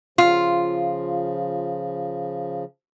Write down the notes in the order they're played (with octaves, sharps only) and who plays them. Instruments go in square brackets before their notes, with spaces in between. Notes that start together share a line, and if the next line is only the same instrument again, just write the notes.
[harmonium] C#3 F3 [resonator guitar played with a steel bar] F4